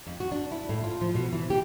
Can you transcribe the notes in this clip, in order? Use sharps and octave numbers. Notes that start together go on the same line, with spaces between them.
F2
F#4
D4
E4
A2
F4
F3
B2
E3
G4